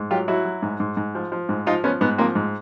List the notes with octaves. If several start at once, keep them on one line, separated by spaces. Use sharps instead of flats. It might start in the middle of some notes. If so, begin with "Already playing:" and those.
Already playing: G#2
F#3 F4 G4
F#3 E4 F#4
F#3
G#2
G#2
G#2
F3
F3
G#2
F3 D#4 F4
F3 B3 C#4
G#2 B3
F3 A#3 C4
G#2